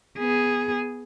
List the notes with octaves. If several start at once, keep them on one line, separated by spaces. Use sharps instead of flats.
B3 G#4